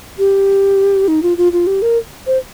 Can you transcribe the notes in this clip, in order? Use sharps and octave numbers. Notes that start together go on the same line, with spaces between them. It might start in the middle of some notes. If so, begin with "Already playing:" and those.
G4
D#4
F4
F4
F4
G4
A#4
C5